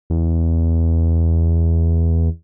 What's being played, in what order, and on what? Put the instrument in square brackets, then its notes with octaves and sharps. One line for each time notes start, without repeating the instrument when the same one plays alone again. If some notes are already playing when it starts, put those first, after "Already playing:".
[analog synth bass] E2